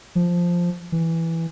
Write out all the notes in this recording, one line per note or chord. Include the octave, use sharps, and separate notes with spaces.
F3
E3